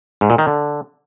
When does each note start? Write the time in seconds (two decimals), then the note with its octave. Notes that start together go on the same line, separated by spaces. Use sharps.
0.21 G#2
0.30 A#2
0.38 D#3
0.47 D3